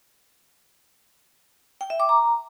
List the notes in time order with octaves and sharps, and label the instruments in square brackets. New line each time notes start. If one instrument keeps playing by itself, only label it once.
[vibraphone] G5
E5
D6
A#5